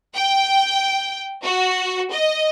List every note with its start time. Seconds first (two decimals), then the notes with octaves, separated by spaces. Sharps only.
0.14 G5
1.44 F#4
2.11 D#5